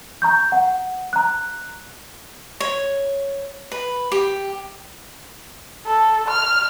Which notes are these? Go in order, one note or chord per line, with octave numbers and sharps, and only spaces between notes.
A#5 C#6 G6
F#5
A#5 F#6
C#5
B4
G4
A4
F6